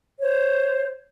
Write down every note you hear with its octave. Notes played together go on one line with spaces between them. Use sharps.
C5 C#5